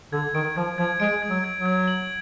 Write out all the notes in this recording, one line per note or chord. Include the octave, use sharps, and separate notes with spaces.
D3 G#6
D#3 D7
F3 G#6
F3 G#6
G#3 D7
G#6
F#3
G#6
F#3
G#6
F#7